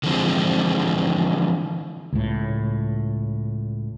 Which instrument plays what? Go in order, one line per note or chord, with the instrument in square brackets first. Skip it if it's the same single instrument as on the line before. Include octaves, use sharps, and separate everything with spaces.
[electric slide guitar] D3 E3 F3 G#3 C4
[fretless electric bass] C#2 A2